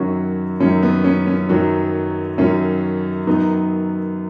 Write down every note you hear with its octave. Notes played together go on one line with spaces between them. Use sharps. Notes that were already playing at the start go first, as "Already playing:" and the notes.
Already playing: F#2 D#3 F#3 C#4 F#4
F#2 D#3 F#3 C#4
B3
C#4
C#4
F#2 D#3 F#3 C#4
F#2 D#3 F#3 C#4
F#2 D#3 F#3 B3 D#4